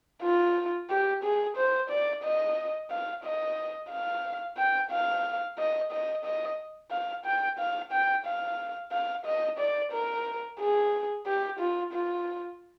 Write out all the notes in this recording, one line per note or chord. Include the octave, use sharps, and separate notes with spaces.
F4
G4
G#4
C5
D5
D#5
F5
D#5
F5
G5
F5
D#5
D#5
D#5
F5
G5
F5
G5
F5
F5
D#5
D5
A#4
G#4
G4
F4
F4